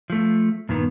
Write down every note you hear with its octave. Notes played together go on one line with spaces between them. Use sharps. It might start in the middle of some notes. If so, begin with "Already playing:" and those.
F3 A3
G2 A#2 D#3 B3